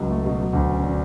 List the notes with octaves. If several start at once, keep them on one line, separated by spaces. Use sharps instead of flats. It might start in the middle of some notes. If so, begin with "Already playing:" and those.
Already playing: C#2 F#3
A3
B2
F#3
D2
C#4
D3